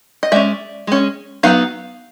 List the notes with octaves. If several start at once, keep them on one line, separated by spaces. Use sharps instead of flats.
D#5
G#3 C#4 D5 E5
G#3 C#4
F#3 B3 D#4 F5